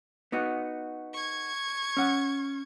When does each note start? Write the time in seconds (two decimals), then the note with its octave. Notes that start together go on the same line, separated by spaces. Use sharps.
0.32 B3 D#4 F#4
1.13 C#6 G#6
1.97 C#4 F#5